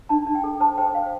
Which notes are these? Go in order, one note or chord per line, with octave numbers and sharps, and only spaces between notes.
D4 A5
D4
G5
A4
C5 A5
C5 G5
C5 F5